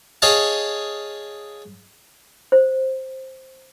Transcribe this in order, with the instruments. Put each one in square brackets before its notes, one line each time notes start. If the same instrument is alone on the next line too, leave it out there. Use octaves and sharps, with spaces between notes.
[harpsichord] G#4 C#5 D#5 F5 A5
[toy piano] C5